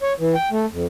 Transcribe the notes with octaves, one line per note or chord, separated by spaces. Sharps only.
C#5
E3
G5
A3
F2